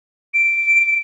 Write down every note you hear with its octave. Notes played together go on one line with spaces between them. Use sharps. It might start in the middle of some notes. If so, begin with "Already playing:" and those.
D7